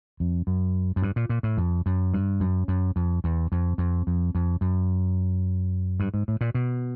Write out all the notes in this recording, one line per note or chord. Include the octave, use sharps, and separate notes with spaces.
F2
F#2
F#2
G2
A#2
A#2
A2
F2
F#2
G2
F#2
F#2
F2
E2
F2
F2
F2
F2
F#2
G2
G#2
A2
A#2
B2